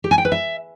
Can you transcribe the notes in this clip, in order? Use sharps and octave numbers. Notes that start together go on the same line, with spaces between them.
G4
G#5
G5
B4
E5